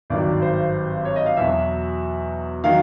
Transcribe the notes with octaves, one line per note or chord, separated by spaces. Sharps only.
G#1 G2 D#3 F#3 D5
C5
C#5
D#5
F5
E2 B2 F#3 E5
D#3 F#3 F5